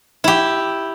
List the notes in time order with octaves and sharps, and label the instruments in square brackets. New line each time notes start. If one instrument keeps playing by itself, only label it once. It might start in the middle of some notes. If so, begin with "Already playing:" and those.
[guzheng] E4 G4